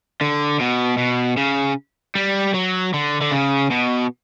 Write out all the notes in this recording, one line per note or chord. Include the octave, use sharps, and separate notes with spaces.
D3
B2
B2
C#3
G3
F#3
D3
D3
C#3
B2